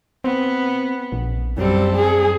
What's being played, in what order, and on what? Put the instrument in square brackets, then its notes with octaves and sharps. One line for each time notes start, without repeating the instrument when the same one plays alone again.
[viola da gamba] B3 [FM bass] C4
[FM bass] A#1
[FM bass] F#2 [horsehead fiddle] G3 [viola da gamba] C4 A4
[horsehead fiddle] G#4